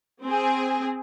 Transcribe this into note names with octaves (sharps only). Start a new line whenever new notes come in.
C4 G#4